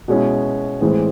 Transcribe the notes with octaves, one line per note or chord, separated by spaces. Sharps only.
B2 G#3 C#4 E4
A2 E3 G#3 C4